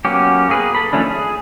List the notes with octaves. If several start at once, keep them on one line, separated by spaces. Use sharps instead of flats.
F#3 A#3 B3 C#4 G4
A#3 G#4 B4
A4 B5
D#3 F3 A3 C#4 D4
G#4